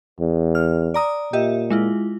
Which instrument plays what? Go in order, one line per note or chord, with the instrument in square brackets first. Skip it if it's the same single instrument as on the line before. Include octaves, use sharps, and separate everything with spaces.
[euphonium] E2
[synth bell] F6
D5 A#5 D#6
[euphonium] A#2 [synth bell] G4 D#5 E5
[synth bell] G#3 E4 F4